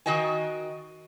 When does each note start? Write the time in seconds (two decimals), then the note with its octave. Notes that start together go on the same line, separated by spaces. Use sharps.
0.06 D#3 F#4 D#5 G5 G#5